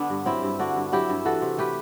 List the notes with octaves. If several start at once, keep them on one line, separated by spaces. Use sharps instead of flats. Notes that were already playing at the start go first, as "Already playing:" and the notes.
Already playing: D3 B3 D4
G2
F#3 C4 E4
G2
D3 D4 F#4
G2
F#3 E4 G4
G2
E3 F#4 A4
C3
A3 G4 B4